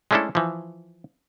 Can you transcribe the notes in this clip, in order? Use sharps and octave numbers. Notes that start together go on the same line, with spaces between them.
G#3 A3 C#4 D4 E4 A4
E3 F3